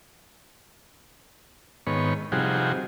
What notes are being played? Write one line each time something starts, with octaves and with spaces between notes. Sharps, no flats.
G#2 D#3 B3 C#5
C3 F3 G3 D#4 F#4 G#4